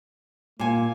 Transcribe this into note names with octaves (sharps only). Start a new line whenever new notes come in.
A#2 A#3 G#5